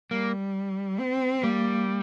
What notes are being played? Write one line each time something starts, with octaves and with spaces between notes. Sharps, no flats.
G3 A#3
C4
G3 A#3